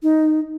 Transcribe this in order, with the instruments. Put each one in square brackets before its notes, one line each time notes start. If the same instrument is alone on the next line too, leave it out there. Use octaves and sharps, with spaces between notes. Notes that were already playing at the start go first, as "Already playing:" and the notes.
[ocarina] D#4